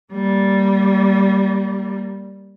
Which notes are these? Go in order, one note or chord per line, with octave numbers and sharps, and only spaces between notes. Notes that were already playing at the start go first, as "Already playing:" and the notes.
G3 A#3